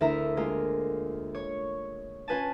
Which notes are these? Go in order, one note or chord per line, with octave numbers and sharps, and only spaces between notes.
D2 E4 A#4 E5 A#5
G#3 A#3 F4 A#4
C#5 C#6
C#4 F4 B4 G#5 A5